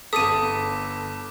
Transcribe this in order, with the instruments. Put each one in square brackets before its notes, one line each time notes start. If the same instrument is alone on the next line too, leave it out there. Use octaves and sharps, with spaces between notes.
[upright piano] G1 A4 [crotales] D6 B6 [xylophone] D#6 D#7